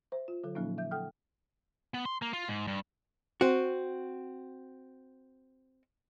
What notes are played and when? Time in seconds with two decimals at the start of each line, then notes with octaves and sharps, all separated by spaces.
0.12 C5 E5
0.28 F4
0.44 D3 F#3 A4
0.55 A#2 F3 F#3 A#3 C#4 D#4
0.78 D3 E5 G6
0.91 A4 F#5 G5 D#6 F6 G6
1.94 B3
2.06 C6
2.22 A#3
2.33 F4
2.48 G#2
2.67 G2
3.41 C4 F#4